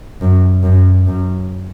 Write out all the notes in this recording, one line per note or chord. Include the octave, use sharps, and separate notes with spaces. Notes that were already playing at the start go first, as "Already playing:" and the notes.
F#2
F#2
F#2